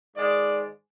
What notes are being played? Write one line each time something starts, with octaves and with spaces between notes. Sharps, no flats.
G#2 D#3 G#3 D5